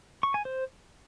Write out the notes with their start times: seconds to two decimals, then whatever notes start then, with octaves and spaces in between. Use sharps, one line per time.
0.23 C#6
0.34 G#5
0.45 C5